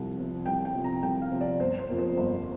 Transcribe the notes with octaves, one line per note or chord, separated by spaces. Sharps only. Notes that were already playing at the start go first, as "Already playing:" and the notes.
Already playing: C2 C3 F3
C3 F3
C2 G5
G5
C3 F3
A#5
C2 G5
F5
C3 F3
D5
G1 C5
C5
F2 F3 A#3
C5
G1